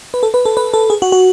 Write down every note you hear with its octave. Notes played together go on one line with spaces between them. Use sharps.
B4
A4
B4
A4
B4
A4
G#4
F#4
F#4